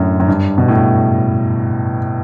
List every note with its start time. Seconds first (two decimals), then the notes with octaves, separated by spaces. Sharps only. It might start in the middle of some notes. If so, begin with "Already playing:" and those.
Already playing: F#2 A2 D3
0.20 F#2
0.28 G2
0.58 B2
0.68 A2